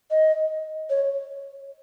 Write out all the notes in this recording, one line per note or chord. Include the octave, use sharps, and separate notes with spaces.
D#5
C#5